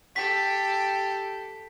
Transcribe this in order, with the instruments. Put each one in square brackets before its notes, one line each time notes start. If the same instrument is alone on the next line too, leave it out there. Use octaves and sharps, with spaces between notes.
[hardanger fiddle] G4 A4 [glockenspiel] B6